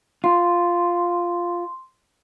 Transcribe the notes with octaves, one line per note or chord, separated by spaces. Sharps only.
F4 C6